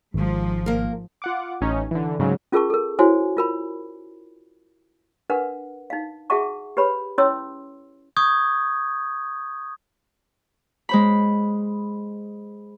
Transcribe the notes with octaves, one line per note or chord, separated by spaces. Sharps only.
G#1 G#2 F3
A#3 A#4
F4 F#5 D6
A1 C#4 D#4
D3 E3
G#2 C#3 F#3
C#4 F4 G#4 A#4 A5 C#6
A4 A#4
E4 F#4 C5 C#5 G#5
F4 A#4 B5
D4 A#4 B4 F#5
D#4 F5
F#4 G#4 E5 F#5 A5 C#6
G4 B4 C#5 B5
C#4 E4 C#5 C6 E6
C#6 D#6 G6 G#6
G#3 C5 B5